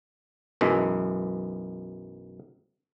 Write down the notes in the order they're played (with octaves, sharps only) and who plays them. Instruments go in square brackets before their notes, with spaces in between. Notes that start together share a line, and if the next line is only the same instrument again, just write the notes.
[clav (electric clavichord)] B1 F#2 E3 G#3